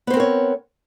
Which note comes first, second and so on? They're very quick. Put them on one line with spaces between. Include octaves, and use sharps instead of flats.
B3 C5 C4 A#4 C#5